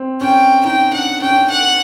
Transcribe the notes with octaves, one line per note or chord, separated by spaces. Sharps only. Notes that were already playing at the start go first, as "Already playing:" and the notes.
Already playing: C4
C#4 G5
D#4 G5
D4 F#5
C#4 G5
D4
C#4
F#5